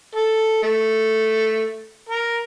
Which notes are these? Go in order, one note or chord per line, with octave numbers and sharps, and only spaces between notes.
A4
A3
A#4